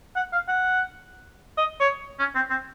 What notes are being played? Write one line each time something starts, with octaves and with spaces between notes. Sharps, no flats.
F#5
F5
F#5
D#5
C#5
C#4
C4
C4